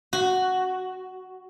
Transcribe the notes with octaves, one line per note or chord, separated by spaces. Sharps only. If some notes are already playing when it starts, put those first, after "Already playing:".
F#4